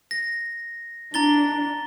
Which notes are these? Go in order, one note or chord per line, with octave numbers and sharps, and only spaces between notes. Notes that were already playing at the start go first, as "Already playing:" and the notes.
A#6
D4 A#5 A6 G7